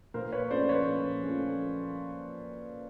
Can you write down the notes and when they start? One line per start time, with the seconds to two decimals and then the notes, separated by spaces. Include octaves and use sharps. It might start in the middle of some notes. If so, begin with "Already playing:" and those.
0.14 A#2 A#4 C5
0.32 B4 C#5
0.51 F3 A3 C#4 C5 D5
0.69 B4 C#5
0.87 A#2
1.24 F3 A3 C#4